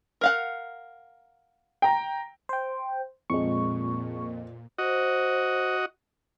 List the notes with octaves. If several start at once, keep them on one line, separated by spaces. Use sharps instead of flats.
A#4 F5 F#5
G5 A#5
C5 G5
F2 A#2 G#3 D#5 C#6
F#4 C5 D#5